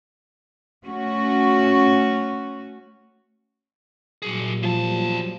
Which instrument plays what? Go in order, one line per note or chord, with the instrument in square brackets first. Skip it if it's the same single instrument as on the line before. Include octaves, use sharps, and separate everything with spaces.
[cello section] A3 C#4 F#4
[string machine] A#2 F#3 G3 [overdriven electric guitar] F#4 G#4
[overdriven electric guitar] E2 A5 [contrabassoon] F3